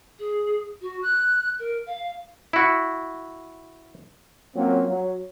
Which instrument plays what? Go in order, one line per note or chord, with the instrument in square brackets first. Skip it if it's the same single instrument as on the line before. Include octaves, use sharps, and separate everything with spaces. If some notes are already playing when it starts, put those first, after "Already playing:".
[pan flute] G#4
F#4
F#6
A#4
F5
[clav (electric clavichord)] E4 F#4
[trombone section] F#3 A#3 C4 C#4 F4
F#3